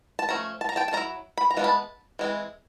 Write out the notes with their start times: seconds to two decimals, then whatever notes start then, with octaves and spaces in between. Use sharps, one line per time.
0.19 A5
0.29 F3 A3 C#4 A#5
0.61 A5
0.69 A#5
0.76 G5 A5
0.88 A5
0.93 D#3 F#3 E4 A#5
1.38 B5
1.51 A#5
1.57 E3 G#3 B3 D4 F4
1.64 A5 B5
2.19 E3 G#3 C4 E4